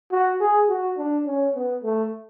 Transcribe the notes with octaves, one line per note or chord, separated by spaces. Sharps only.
F#4
G#4
F#4
D4
C#4
B3
A3